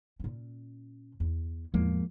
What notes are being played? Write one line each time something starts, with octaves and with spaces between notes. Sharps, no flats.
A#2 C#4
E2
E2 A2 F3 G#3 A#3